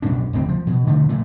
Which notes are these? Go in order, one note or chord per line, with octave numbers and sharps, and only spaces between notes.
F#2 B2 C#4 D4
F#1 D2 C4
F3
B2
D3 F3 A3
A#2 A3